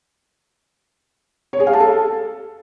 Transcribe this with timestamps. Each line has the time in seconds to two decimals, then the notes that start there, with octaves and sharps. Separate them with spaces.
1.53 C#5
1.60 G#4
1.67 F5
1.73 A5
1.80 A4